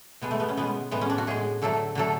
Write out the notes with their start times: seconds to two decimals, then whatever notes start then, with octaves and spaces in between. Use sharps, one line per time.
0.22 B2 G#3 B3
0.31 A3
0.40 B3
0.48 C#4
0.57 B2 G#3 B3
0.91 A2 G#3 B3
1.01 C#4
1.10 D4
1.18 F#4
1.27 A2 G#3 G#4
1.62 D3 F#3 A3 A4
1.95 D3 F#3 A3 A4